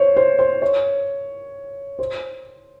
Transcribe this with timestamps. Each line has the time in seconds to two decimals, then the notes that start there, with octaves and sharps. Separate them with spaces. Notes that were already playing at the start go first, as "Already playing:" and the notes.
Already playing: C5 C#5
0.17 C5
0.39 C5
0.62 C#5
1.99 C5